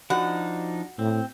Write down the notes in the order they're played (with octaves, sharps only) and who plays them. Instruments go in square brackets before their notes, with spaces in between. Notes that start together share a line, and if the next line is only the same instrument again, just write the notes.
[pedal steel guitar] F3 D4 D#4 [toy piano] F#4 [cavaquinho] F#5
[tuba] A2 [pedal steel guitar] C4